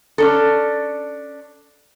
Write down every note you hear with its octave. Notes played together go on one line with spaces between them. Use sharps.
C#4 D4 A4